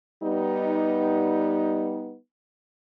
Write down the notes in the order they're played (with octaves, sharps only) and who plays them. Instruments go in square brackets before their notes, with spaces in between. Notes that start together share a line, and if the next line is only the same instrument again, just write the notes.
[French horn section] G3 B3 D#4